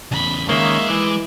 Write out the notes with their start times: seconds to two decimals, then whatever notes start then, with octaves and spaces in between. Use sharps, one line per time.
0.12 E2 C#3 B5
0.48 D#3 G#3 A#3 C#4 E5
0.88 E3 D6